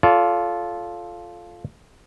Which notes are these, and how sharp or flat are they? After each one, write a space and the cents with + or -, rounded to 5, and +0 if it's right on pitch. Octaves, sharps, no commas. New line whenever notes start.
F4 +0 A4 -15 D5 -45